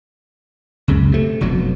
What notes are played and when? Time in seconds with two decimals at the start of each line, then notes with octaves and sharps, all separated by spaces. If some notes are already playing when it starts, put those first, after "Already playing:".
0.88 C#2 F#2 C#3
1.12 C3 A3
1.41 F1 B2 F#3